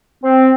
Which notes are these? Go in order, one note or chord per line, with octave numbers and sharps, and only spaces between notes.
C4